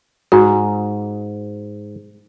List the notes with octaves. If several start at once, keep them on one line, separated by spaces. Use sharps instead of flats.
G#2 F#4